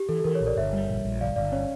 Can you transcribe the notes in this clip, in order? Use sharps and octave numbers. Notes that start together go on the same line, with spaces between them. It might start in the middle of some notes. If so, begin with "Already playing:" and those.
Already playing: G4
E3 A4
A4
E3 A#4
C#5
A#1
A#4 D5
G1 C#5 E5
G3
A#1
A#1
G1 D5 F5
G1 D5 F5
C#4 C#5